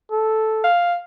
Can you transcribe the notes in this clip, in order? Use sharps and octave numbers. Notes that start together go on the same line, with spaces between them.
A4
F5